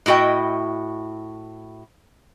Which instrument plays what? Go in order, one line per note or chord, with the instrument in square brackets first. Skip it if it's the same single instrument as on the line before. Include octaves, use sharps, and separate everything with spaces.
[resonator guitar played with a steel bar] A2 E4 F#4 D#5 G5